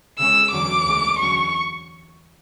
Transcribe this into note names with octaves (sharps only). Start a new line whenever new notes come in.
C#3 G#3 C#4 E6
E2 D3 F#3 C#4 D6
D2 C#3 G#3
E2 D3 F#3 C#4 C#6